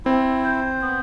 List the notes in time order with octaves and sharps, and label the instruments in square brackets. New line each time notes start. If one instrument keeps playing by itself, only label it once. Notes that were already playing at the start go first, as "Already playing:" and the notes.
[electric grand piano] C4 [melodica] E4
[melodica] C5
B3